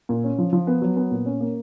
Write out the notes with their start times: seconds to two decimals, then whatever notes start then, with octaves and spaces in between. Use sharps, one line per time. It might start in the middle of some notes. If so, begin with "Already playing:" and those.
0.09 A#2
0.24 C#4
0.38 F3
0.53 F3
0.67 B3
0.82 F#3
0.96 B3
1.11 A#2
1.26 C#4
1.41 A#3